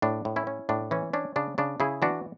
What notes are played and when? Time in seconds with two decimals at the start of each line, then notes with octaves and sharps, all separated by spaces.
0.02 A2 D4
0.25 A2
0.36 C#4 E4
0.47 C#4
0.69 A2 D4
0.91 E3 C#4
1.13 C#4 D4
1.36 C#3 D4
1.58 C#3 D4
1.80 C#3 E4 G#4
2.02 E3 D4 F#4